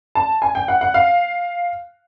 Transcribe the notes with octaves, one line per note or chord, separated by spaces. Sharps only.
A5
G#5
G5
F#5
F#5
F5